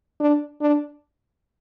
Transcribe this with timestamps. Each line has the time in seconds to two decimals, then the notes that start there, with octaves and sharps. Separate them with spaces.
0.20 D4
0.61 D4